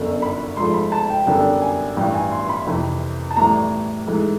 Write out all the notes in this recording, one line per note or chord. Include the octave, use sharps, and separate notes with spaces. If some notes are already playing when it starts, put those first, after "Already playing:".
Already playing: G1 F#2 D3
B5
G#2 F3 A3 C6
B5
A5
G5
F#2 D3 G3 B3 D4 G5
G#5
A1 G2 E3 G5
G#5
C6
B5
F2 C3 E3
A5
A1 A2 E3 G3 A#5
G#2 E3 A3